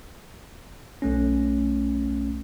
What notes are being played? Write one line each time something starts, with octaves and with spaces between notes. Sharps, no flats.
B1 A3 C#4